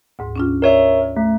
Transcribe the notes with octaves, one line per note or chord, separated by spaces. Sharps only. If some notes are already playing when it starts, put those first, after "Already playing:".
D2 G#2
C#4 D4 F4
A#4 C#5 D5 E5
A3